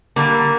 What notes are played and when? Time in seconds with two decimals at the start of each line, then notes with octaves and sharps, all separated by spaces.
0.16 D3 G3 A#3